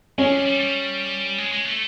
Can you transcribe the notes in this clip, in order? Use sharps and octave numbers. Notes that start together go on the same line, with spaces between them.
G#3 C#4
G3
G3
G3
G#3
G#3
A3